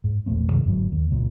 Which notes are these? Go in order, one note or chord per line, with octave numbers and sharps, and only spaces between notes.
G#2
E1 A#1 A3 C4
F#2 C3 D#3 G#3
G1 G#2 F#3
D#2
F#1 C#2 A#2